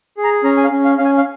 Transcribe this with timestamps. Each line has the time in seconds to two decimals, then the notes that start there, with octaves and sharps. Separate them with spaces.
0.17 G#4
0.24 A#5
0.44 C#4 A#5
0.57 G#5
0.64 F5
0.72 C#4
0.85 F5
0.98 C#4 F5
1.05 G#5
1.18 F5